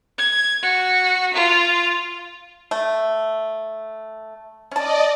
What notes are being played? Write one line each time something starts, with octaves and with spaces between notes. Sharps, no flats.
G#6
F#4
F4
A3
C#4 D5 D#5 A5